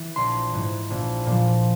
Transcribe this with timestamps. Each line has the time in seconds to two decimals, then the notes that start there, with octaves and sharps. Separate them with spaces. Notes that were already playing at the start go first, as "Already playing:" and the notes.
Already playing: E3
0.16 A#1 C6
0.53 G#2 E3
0.90 A#1
1.26 A#2 F3